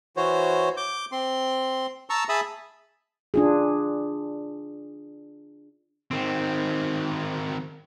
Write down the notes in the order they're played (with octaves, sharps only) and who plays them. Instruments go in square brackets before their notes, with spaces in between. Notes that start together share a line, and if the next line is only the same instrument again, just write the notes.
[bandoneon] E3 F#4 C5 C#5
D6 G6
C4 C6
A5 A#5 C#6 E6
G#4 E5 A5 B5 D#6
[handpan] D4 F4 G#4
[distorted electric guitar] D#3 C4